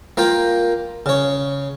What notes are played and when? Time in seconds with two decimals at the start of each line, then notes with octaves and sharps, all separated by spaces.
0.17 A#3 F4 A#4 G5
1.06 C#3 C#5